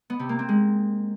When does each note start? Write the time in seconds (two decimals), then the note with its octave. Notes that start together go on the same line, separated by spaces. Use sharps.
0.10 B3
0.19 C3
0.29 A#3
0.39 C4
0.49 G#3